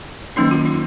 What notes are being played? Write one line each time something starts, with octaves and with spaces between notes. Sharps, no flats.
D#3 F#3 A#3 C#4 D#4
F4
D#4